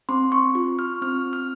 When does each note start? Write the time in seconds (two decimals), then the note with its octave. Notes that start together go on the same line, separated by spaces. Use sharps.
0.09 C4 C6
0.32 C#6
0.55 F4 C#6
0.79 F6
1.02 C4 F6
1.33 F6